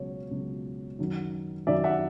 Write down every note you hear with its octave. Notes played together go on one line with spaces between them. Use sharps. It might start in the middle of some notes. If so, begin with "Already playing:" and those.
Already playing: C#2 B2 F#3 C#5
C#2 B2 F#3
F#2 D#3 F#3
F#2 D#3 F#3 D5 E5
E5 F#5